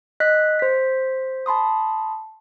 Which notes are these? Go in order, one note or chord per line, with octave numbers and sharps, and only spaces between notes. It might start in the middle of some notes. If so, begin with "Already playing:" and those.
D#5 F#6 B6
C5 B6
A5 B5 C6 D#6